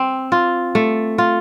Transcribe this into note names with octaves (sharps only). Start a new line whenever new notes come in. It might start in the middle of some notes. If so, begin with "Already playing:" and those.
Already playing: C4
F4
A3
F4